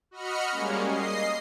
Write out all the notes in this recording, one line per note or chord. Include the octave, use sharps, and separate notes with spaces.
F#4 D#5 B5 F6 C#7
G3 G#3 A#3 C#4
D#5 C7